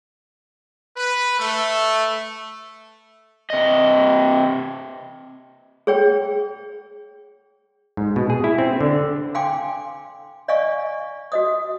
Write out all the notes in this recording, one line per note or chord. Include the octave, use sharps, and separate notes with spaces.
B4
A3
C3 D#5
G#4 C#5 G5
G#2
B2
G#4
E4
C4
D3
F5 G5 G#5 C6 D6
D5 D#5 F5 G#5 C#6
F#4 D#5 D#6